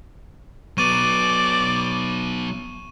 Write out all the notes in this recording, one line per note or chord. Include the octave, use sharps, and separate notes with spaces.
F#3 B3 D5 C#6 D#7